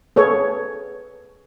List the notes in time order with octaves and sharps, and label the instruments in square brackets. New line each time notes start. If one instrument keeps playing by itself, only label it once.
[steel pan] G#4 A4 B4 C#5